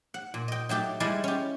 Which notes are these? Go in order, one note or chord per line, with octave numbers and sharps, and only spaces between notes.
F#5
A#2
D#5 G5
F#3 A3 G4 A4
G3 G#3 E4 D5 G#5
C#4 G4